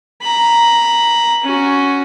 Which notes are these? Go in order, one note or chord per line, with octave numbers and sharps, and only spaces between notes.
A#5 B5
C#4 F#4